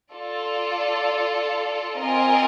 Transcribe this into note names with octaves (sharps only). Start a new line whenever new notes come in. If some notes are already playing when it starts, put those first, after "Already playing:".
F4 A4 D5
C4 F4 A#4 D#5 G#5